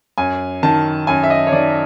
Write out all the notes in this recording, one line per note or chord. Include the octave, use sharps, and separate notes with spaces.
F#2 G#5
D#3 A5
F#2 G#5
E5
D#5
C#5
D#3 D5